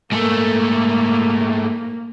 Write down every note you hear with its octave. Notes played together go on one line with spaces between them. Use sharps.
G#2 A3 A#3